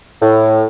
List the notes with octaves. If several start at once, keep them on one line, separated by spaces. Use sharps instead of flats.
A2